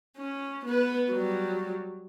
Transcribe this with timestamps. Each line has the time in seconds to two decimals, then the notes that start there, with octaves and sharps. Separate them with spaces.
0.17 C#4
0.66 B3 B4
1.11 F#3 G3